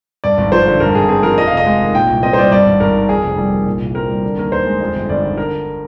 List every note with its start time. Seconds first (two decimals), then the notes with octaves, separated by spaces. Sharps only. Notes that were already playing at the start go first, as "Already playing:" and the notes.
0.24 G2 D5
0.38 G#1
0.52 F3 C5
0.67 D3
0.80 G2 A#4
0.94 G#1 G#4
1.09 C4 G#4
1.23 F3 A#4
1.38 F2 D#5
1.47 F5
1.53 F1 D#5
1.66 G#3
1.81 D#3
1.94 A#2 G5
2.09 C2
2.23 C4 D#5
2.33 C5
2.37 G3 D5
2.51 G2 D5
2.66 G#1
2.80 G#1 A#4
2.95 D#3
3.09 F2 G#4
3.24 F1
3.37 G3
3.52 D#3
3.66 A#2
3.80 C2
3.94 C4 A#4
4.09 G3
4.23 D3
4.37 D#2 A#4
4.51 D#2 C5
4.67 G#3
4.81 F2
4.95 G1
5.09 G1 D5
5.23 D#3
5.37 D3 A#4